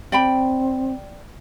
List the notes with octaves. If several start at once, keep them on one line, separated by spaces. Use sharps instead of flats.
C4 D5 G5 B5